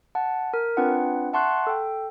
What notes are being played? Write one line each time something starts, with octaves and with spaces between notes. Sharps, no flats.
F#5 A5
A#4
C4 D4 F4 B4 F#5
E5 F#5 A5 C6 C#6 F#6
A4 G5